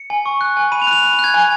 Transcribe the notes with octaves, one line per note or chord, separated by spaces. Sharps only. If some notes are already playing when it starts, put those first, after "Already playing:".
Already playing: C#7
G#5
C#6
F#6
G#5
B5 D#7
F7
F#6
F7
B5 F7
F7
F#6
G#6
G#5